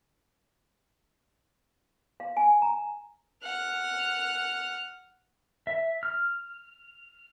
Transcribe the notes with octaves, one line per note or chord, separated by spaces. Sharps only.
F5
G#5
A#5
F#5 F6
E5
F6